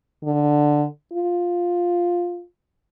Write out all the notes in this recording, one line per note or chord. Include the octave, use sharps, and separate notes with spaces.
D3
F4